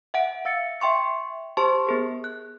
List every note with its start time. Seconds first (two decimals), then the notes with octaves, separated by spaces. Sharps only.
0.14 E5 F#5 D7
0.45 F5 E6 A6 C#7
0.80 E5 G5 C6 C#6 C#7
1.57 G4 C5 A5 C6 C#6
1.87 B3 G#4 A#4
2.24 F#6